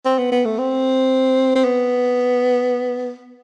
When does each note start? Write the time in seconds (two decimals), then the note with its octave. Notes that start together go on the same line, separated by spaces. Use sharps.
0.05 C4
0.19 B3
0.32 B3
0.45 A3
0.59 C4
1.55 C4
1.64 B3